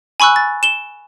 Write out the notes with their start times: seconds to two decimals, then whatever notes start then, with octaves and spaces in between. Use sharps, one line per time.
0.20 G#5 B5 C#6 E6 F#6
0.36 A6
0.63 E7 G7